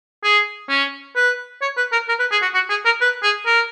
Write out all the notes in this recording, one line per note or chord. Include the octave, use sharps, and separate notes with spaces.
G#4
C#4
B4
C#5
B4
A#4
A#4
B4
G#4
F#4
F#4
G#4
A#4
B4
G#4
A#4